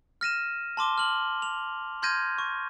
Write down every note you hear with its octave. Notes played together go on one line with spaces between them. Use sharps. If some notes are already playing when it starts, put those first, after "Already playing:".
F6 A#6 D#7 E7
A5 C6 D6 G7
F6 F#7
F7
C6 F6 G6 G#6 A#6 D#7
C#6